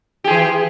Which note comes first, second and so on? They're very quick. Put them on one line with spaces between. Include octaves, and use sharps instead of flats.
G4 G#4 E3